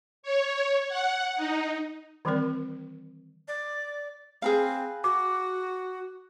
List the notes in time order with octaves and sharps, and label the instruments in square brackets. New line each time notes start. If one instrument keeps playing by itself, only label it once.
[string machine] C#5
F#5
D#4
[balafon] D#3 E3 G3 C4 A#4 D5
[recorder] D5
[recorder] C4 [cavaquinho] G#4 B4 F5
[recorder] F#4 [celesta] D6